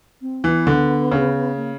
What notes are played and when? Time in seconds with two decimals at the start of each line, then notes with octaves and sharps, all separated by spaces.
0.22 C4
0.44 E3 B3
0.67 D3
1.12 C#3
1.56 A#3